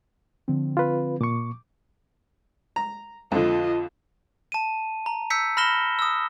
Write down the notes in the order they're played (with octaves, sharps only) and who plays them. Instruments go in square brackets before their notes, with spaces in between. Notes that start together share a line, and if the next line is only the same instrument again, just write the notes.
[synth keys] D3 F3 C4
[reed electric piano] F4 B4
[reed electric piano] A#2 C#6 [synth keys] D6
[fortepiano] A#5
[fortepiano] F2 D3 [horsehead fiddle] F4 D#5
[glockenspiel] A5 D#7
A#5
E6 G6 B6 C#7
B5 F6 A#6 E7 G7
D#6 E6